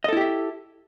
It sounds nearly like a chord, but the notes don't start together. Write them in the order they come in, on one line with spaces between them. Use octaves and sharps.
D#5 A4 E4 G4 E5